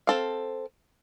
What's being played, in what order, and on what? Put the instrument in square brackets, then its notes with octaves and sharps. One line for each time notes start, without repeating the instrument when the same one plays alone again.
[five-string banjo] C4 A4 F5